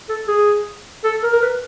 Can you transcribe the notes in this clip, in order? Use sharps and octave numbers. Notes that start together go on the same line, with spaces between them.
A4
G#4
A4
A#4
A#4
B4